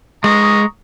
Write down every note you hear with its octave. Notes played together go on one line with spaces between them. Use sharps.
G#3 A#5 C#6 D#6